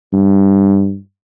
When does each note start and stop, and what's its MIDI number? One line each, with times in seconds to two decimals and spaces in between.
0.13 0.98 43